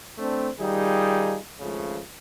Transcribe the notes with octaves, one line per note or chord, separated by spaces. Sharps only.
A3 C4 D4
D#3 G3 D#4 F4 G#4
G#1 C#2 C#3 F3 A3